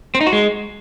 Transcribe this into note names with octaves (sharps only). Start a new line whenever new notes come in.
C4
D#4
F#4
G#3